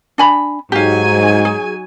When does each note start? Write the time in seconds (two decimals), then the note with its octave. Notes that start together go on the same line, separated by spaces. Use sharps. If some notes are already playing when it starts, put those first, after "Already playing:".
0.18 D4 G#5 B5
0.72 G#2 F#3 D#4 G4 F5 G#5
1.45 G#4